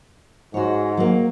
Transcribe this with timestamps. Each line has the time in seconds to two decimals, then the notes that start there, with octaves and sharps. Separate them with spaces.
0.54 G#2 F#4 C#5
0.97 F#3 A#3